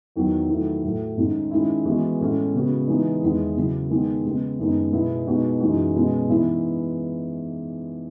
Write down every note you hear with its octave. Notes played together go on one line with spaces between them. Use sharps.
E2 D#3 F#3
D#3 F#3 A3 E4
A2 F#3 A3
G#2 D#3 G#3 C#4
D#3 G#3 C#4 E4
E3 G#3 B3 F#4
A2 G#3 C#4 E4
C#3 G#3 B3 F#4
E3 G#3 B3 D#4
E2 D#3 G#3 B3 E4
C#3 F#3 C#4 E4
D#3 G#3 B3
C#3 G#3 B3
F#2 D#3 G#3 B3 D#4
B2 G#3 B3 E4
B2 G#3 D#4 F#4
F#2 E3 G#3 D#4 F#4
B2 G#3 C#4
G#2 E3 B3 E4